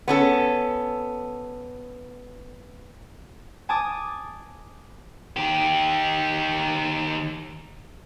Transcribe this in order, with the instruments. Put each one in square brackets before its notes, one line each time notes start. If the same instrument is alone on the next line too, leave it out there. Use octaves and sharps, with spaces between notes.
[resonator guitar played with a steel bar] B3 C#4 A4
[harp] G#5 A5 D6 D#6
[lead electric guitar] D#3 G4